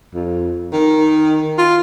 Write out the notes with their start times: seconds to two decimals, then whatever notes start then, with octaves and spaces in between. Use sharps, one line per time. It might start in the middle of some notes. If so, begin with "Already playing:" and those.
0.14 F2
0.73 D#3
1.58 F4